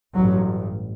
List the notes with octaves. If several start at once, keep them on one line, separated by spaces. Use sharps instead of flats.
A1 G2 F#3